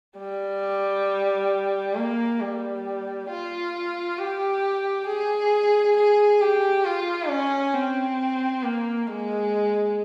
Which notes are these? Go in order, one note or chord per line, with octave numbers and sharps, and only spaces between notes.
G3
A#3
G3
F4
G4
G#4
G#4
G4
F4
C#4
C4
A#3
G#3